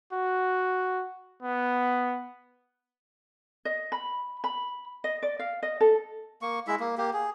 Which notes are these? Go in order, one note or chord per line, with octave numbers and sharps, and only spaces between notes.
F#4
B3
D#5
B5
B5
D#5
D5
F5
D#5
A4
A#3 C#6
G#3 E4 E5
A#3
A#3 G4
G#4